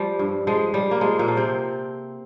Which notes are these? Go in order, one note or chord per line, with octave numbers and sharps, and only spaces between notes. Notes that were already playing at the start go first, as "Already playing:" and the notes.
Already playing: F3 G3
G2
F3 G#3
F3 G3
A#3
F3 G#3
A#2 A#3
F3
C3 C4